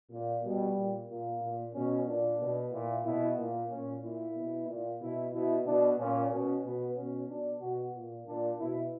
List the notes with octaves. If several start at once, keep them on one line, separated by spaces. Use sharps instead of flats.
A#2
B2 G3
A#2
A#2 A#3
A#2
B2 C#4
A#2 D4
B2
A#2 E4
B2 E4
A#2
A#2 C#4
A#2 E4
B2
A#2
B2 E4
B2 E4
B2 D4
A#2 C#4
B2 C#4
B2 B3
B2 C#4
B2 D4
B2 F#4
A#2
A#2 D4
B2 E4